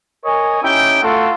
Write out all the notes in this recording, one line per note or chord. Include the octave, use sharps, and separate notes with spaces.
A#4 C#5 D#5 G#5
C#4 D#4 E4 G4 G5
A3 F4 F#4 A4